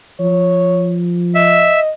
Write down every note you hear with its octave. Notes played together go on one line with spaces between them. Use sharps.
F3 C#5
D#5 E5